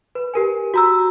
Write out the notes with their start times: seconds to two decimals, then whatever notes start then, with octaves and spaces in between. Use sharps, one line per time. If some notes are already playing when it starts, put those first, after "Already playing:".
0.15 B4
0.34 G4 A#4 G#5
0.74 F#4 A#5 E6